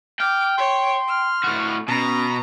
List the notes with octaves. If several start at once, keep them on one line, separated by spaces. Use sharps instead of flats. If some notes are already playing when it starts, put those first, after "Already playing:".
G5 D6 F6
C#5 C6
F6
A2 F#4
B2 C#4 A#5